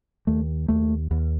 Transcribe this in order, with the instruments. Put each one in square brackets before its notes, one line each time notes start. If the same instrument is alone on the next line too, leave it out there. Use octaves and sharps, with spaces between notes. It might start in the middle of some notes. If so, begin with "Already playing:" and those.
[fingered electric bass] D#2 A3
D#2 A3
D#2